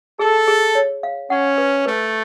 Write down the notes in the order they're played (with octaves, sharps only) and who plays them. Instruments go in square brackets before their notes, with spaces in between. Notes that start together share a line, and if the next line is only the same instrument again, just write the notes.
[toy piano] G#4 [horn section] A4
[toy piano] G#4
C#5
F5
[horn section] C#4 [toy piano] F#5
[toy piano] B4
[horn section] A3 [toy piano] B4